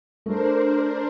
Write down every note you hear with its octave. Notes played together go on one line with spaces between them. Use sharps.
A3 D4 A#4 C5